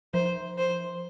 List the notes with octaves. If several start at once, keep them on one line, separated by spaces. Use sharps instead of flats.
F3 C5
C5